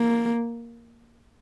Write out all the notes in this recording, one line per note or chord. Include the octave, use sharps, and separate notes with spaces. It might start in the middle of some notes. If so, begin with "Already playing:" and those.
Already playing: A#3